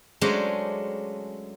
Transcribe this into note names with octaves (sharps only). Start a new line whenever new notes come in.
F#3 G#3 A3 C#4 D4 C5